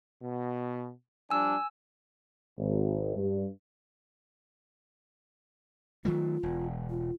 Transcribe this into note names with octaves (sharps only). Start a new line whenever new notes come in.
B2
F3 G3 D4 G#5 E6
G#1
G2
D#3 F#3 A3 F4
E1
F4